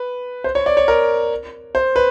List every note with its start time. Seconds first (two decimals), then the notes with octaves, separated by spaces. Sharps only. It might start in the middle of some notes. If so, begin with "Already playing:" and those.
Already playing: B4
0.44 C5
0.55 C#5
0.66 D5
0.77 C#5
0.88 A#4
1.75 C5
1.96 B4